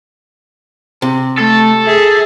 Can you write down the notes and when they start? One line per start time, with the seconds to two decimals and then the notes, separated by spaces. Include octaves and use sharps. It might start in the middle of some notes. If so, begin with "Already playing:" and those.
1.02 C3
1.39 A3 A4
1.87 G#4 E5